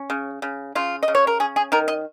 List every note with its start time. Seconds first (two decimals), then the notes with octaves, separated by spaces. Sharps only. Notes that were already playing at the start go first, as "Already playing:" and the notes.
Already playing: C#4
0.10 C#3
0.42 C#3
0.75 C#3 F4
1.03 D#5
1.08 C#3
1.15 C#5
1.27 A#4
1.40 C#4 G#4
1.56 G#4
1.72 D#3 A#4
1.88 D#5